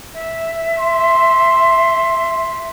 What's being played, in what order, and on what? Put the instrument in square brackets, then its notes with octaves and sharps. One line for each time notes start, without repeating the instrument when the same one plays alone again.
[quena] E5
[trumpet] C6